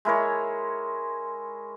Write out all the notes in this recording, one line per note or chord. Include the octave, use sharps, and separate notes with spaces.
G#3 E4 A#4 C#5